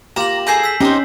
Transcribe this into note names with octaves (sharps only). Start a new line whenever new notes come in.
A#3 F4 G4 A#5 E7 F#7
G#4 A4 G#5 A#5 G6 C7
E6 B6
C3 C#4 D#4 G4 C5 D#5